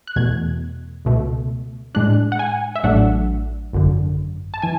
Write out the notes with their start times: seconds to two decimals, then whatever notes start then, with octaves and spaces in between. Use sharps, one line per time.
0.07 F#6
0.16 E2 B2 A3 G#6
1.05 C#2 B2 A3
1.95 A2 G#3 D4 F#6
2.32 F#5
2.39 G#5
2.76 E5
2.83 A1 A2 F#3 A3 D4 F#5
3.73 G#1 F#2 D3
4.54 A5
4.62 E3 G#5